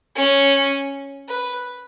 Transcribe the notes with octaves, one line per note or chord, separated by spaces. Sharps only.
C#4
B4